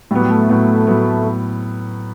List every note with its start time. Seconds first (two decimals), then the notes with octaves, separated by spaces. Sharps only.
0.11 A2 F#3 G3 B3
0.31 A3
0.49 A2 F#3 B3
0.87 A2 F#3 B3